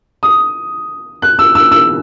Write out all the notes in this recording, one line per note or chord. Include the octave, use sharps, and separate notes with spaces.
D#6
F#6
E6
E6
E6